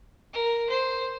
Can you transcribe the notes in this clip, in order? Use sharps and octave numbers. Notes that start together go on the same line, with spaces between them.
A#4
C5